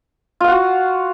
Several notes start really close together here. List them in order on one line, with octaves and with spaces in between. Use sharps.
F4 F5 F#5 F#4